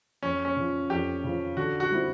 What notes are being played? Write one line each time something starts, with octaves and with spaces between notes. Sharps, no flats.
F2 C#4
C#4
C#3 F3
F2 G4
C#3 F3
D3 F#4
F#4
G3 C4 E4 G4